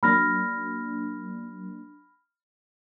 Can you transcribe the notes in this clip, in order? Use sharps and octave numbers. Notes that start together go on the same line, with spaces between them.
F#3 A#3 D4 B5 F6 A#6